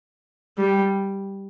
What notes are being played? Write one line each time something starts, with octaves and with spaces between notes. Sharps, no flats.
G3